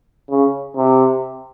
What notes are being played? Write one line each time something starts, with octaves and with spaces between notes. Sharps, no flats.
C#3
C3